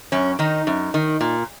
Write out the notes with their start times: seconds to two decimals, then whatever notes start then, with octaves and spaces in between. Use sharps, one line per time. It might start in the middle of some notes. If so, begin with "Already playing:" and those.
0.12 F#2 C#4
0.39 D#3 D#4
0.67 F#2
0.94 D#3
1.21 A#2